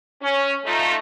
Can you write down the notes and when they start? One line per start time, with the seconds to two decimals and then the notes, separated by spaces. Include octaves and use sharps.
0.22 C#4
0.65 A3 D#4 F4